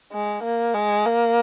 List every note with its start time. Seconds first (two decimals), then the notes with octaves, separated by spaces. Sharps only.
0.12 G#3
0.43 A#3
0.74 G#3
1.05 A#3